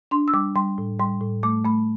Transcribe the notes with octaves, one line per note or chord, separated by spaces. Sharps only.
D4 C6
E6
G3 D6
G3 C6
A2
G3 C6
A2
A3 D6
A3 B5